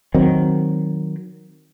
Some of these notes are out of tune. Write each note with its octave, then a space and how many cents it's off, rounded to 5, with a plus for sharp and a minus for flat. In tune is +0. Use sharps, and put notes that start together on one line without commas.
D#3 +0 F#3 +0 C4 +0